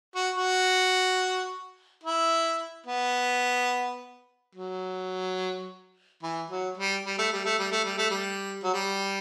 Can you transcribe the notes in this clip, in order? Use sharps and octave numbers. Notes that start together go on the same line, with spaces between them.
F#4
F#4
E4
B3
F#3
E3
F#3
G3
G3
A3
G3
A3
G3
A3
G3
A3
G3
F#3
G3